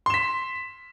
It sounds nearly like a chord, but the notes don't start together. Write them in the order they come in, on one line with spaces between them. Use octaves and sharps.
C6 E7 B6